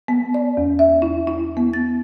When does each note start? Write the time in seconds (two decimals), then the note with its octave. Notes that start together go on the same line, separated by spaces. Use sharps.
0.08 B3
0.34 D5
0.57 E2
0.79 E5
1.02 E4
1.27 E4
1.57 B3
1.73 A6